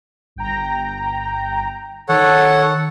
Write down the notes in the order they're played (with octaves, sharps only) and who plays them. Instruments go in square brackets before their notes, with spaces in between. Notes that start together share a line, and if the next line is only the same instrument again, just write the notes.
[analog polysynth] G1 G5 A#5
[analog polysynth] D#3 [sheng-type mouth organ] A4 C#5 F#5